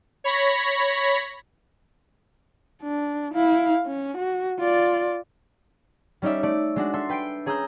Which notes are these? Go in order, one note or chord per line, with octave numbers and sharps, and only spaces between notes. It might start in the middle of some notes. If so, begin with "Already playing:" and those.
C#5 B5 A#6 B6
D4
E4 F5
C#4
F#4
F4 D5
G3 C#4 D#4 D5 E5
A3 D5
G#3 D4 F#4
A4 E5 C6
B4 G5 C7 D7
C#4 G#4 A#5 D#6 E6 G6